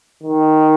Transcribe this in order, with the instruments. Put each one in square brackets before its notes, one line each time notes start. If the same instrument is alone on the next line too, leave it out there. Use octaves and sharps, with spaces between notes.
[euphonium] D#3